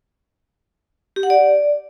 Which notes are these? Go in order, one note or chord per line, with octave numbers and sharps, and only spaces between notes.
G4
F#5
D5